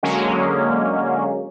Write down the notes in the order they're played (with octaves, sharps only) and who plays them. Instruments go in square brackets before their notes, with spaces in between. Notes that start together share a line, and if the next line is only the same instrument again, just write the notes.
[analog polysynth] D3 F#3 G#3 A#3 C#4